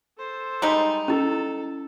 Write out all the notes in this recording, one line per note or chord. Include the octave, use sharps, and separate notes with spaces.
A4 C5
G3 G#3 D#4
C#4 E4 A4